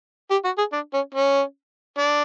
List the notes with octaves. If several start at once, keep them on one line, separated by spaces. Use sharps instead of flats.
G4
F#4
G#4
D4
C#4
C#4
D4